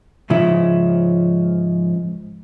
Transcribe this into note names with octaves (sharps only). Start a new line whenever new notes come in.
G#2 C#3 F3 C#4 E4